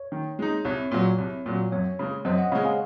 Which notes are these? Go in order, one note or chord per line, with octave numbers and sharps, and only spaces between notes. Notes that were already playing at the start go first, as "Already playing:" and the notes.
Already playing: C#5
D#3
G#3 D#4
C2 C#5
A#2 F#3
C2
A#2 F#3
F#2 C#5
C#3 G#3
F#2 C5 D#5
D#5 F#5
C#3 G#3 C#5 F5
F5 G#5